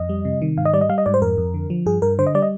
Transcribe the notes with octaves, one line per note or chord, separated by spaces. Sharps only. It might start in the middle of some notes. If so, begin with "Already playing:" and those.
Already playing: F2 D#5
G3
C3
D#3
G#2 F5
D#5
G3 D5
D#5
G3 F5
D#5
G#2 D5
C5
F2 A#4
F2
D3
F3
G2 G#4
G2 A#4
D3 C5
D#5
G3 D5
D#5